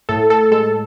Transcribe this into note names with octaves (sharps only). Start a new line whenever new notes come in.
A2 A4
A4
G#3 A4